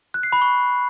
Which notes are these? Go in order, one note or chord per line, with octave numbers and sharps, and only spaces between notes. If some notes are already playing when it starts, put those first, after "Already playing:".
F#6
C7
B5
C#6